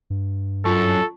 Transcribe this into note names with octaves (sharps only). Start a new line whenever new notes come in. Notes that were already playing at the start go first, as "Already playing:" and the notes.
G2
F#2 F4 A4 A5 C#6